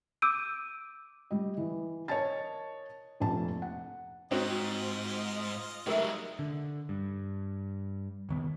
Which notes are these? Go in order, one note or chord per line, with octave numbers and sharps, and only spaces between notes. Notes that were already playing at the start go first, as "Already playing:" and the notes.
D6 E6 G6 D7 D#7
G3 D#5
E3
A#4 C#5 D#5 A5 A6
F1 A#1 F2 A5
F#5
G#2 C4 D#4 F4 F#4 D#5
F#3 G#3 A3 D#4 G4 A#4 E5
D3
G2
D#1 D#3 B3